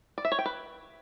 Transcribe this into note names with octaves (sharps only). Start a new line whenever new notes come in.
D5
E5
C#5
G5
B4